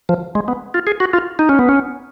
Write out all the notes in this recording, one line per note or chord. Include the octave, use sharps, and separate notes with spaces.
F3
G#3
B3
F4
G#4
F#4
F4
D#4
C#4
B3
C#4